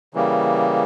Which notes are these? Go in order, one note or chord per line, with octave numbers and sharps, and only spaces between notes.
C#3 E3 G3 A#3